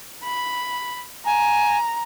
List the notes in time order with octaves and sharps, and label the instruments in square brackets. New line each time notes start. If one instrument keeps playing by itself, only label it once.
[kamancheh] B5
[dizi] G#5 [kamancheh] A#5